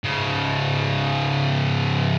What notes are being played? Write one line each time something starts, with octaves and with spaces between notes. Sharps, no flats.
G#2 C#3